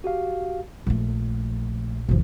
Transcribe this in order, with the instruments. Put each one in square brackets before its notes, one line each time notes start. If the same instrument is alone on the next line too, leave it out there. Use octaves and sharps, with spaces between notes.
[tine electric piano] F#4 G4 F5
[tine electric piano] A#1 A#2 [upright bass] F3 A3
[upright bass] G#1 D#2 [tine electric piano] B2 F3